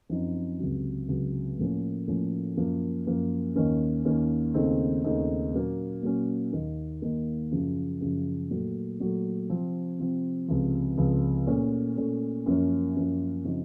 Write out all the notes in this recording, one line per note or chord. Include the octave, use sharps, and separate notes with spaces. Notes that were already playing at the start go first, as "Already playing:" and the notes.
F#2 F3 C4 D#4
C#2 C3 F#3
C#2 C3 F#3
A2 F3 A#3 C#4
A2 F3 A#3 C#4
F#2 F3 A#3
F#2 F3 A#3
D#2 D#3 A#3 C#4
D#2 D#3 A#3 C#4
D#2 C#3 A3 C4 D#4
D#2 C#3 A3 C4 D#4
A#2 F#3 A#3 C#4
A#2 F#3 A#3 C#4
D#2 D#3 A#3
D#2 D#3 A#3
F#2 C#3 F3
F#2 C#3 F3
A#2 F#3 A3
A#2 F#3 A3
C3 F3 C4
C3 F3 C4
C#2 C3 F3
C#2 C3 F3
A#2 A3 C#4
A#2 A3 C#4
F#2 F3 A#3 C#4
F#2 F3 A#3 C#4
C#3 F3 C4 D#4